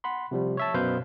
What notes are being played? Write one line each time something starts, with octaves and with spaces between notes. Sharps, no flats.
F#5 B5 C6
C3 F3 G3
C#5 E5 A5
F#2 B2 B4 C5 F5 G6